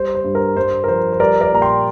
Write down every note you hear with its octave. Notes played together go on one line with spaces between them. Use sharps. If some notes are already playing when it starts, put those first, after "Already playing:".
Already playing: G3 C5
C5
G2
A#4
G2 C5
A#4
F3 C5
C5
G3 A#4 D5
A#4 D5
A#2 A#5
G5 C6